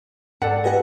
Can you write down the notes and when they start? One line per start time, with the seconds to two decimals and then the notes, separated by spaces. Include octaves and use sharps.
0.42 G#2 A4 D5 F#5
0.64 G4 B4 D#5 F#5 G#5